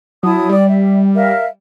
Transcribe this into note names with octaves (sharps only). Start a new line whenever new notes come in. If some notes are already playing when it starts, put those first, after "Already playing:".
F#3 E4 A5 D#6
G3 D5
E5
A#4 E5 F5